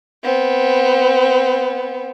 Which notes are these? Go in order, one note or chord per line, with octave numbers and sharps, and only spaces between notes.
B3 C4